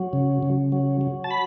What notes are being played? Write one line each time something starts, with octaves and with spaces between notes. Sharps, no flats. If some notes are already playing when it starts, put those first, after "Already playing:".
Already playing: F#3
C#3
C#3
F#3
F#3
A5
B5